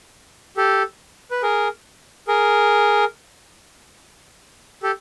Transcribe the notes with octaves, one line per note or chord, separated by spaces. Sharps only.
G4 A4
B4
G#4 A#4
G#4 A#4
G4 A4